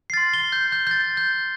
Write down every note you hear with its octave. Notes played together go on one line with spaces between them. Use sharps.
C7
C6 F6 A6
G7
G6
G6
G6
A6
G6